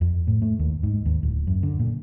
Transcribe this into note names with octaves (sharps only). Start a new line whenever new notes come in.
F2
A2
A3
D#2
G#2
D#2
D1
F#2
D3
A#2